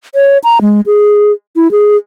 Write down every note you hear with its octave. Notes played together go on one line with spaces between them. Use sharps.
C#5
A#5
G#3
G#4
E4
G#4